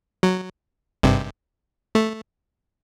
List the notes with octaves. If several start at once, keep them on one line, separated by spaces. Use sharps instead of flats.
F#3
G#1 G2 C3
A3